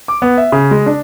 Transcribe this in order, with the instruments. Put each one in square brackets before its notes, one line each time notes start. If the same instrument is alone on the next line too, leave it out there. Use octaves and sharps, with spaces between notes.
[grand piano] D6
B3
E5
C#3
G#3
D4